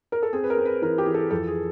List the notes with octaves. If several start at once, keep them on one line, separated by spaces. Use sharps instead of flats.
A#4
A4
C4 G#4
B4
A#4
C4
B4
E3 A#4
G4
E3 G#4
A4
F2 A4
G#4